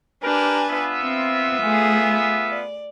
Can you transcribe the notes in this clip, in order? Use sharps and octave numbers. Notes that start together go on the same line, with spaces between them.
D4 G4 A#4 B4 G#5
B3 F4 E5
C4
A3 G#4
D5